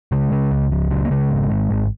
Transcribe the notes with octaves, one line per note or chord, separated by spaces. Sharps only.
C#3 G#3
C#3
C#2
C#2 F3
C#3 F#3
A#3
C#3 G#3
G#1
G#1
G#1